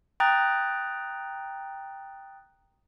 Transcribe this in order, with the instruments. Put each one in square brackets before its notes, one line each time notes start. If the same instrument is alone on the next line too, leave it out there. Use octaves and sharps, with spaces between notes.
[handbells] G5 A#5 D#6 F#6 A6